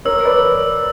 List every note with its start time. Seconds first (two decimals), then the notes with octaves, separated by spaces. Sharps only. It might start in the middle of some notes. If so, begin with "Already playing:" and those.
0.05 A#4 C#5 E6
0.25 B4 D5